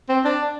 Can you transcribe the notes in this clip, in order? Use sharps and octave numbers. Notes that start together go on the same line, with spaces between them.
C4
D4